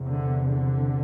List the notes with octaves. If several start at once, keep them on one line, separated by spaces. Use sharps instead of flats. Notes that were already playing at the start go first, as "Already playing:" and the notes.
Already playing: E2 C3
D3
D3